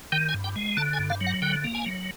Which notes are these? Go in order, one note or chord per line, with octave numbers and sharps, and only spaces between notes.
D#3 G5
G#5
G2
G5
G#3
D3 A5
G#5
G2
F5
F#3
F#5
D3 G5
A#3
G#5
F#3